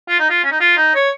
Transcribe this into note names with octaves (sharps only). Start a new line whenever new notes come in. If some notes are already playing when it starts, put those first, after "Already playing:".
F4
D#4
F4
C#4
D#4
F4
D#4
C#5